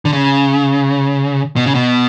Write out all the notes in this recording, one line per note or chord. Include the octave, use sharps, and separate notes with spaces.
D3
C#3
B2
C#3
B2